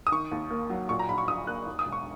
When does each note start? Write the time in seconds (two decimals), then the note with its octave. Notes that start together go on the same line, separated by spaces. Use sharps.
0.07 D#6
0.12 D#3 C#6
0.31 D#2
0.50 A#3
0.70 F#3
0.89 A#2 C#6
0.99 A#5
1.08 A#1 B5
1.18 C#6
1.27 A#1 D#6
1.47 A#3 F#6
1.66 D#2
1.79 D#6
1.86 E1
1.92 C#6